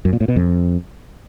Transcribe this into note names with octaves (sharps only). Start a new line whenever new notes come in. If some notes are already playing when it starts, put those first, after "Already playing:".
F#2
A#2
A2
B2
F2